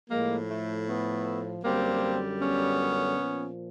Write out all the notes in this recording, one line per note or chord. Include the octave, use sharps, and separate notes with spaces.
A2 F3 G#3 A#3
A3
A3 B3
F#2 D3 G3 A#3 C4
B3 C#4
A#2 F3